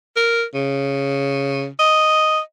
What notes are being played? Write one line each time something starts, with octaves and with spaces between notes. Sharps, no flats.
A#4
C#3
D#5